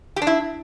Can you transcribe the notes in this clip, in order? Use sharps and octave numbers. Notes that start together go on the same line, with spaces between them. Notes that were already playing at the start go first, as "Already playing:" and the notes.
G4
D4
E4